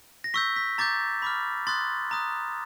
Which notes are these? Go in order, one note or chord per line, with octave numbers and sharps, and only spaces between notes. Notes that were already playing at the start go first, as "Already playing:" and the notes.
A#6
C#6 E6 G6 B6
B6
A#5 D6 G6 A6
B5 D6 F6
C6 D#6 F#6 A6
A#5 D#6 F#6